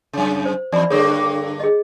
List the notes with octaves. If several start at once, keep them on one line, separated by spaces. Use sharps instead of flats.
F#2 C#3
C5
E2 D5 B5
G2 D3 A#3 G#4 C#5 D#6
G#4 D#5